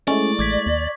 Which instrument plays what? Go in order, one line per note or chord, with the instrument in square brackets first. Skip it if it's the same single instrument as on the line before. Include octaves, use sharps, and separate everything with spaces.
[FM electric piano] G#3 A3 E4 [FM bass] C#4 [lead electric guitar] D5 [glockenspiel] C#6
[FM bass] A1 [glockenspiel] D6 G#6 B6
[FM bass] D#2